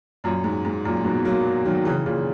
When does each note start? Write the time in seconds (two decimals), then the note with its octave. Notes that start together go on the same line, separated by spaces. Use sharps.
0.24 F#2 A#2
0.44 G#2
0.65 G#2
0.85 F#2 A#2
1.05 G#2 B2
1.25 F#3 A#3
1.65 D#3 F#3
1.85 C#3 E3
2.06 A#2 C#3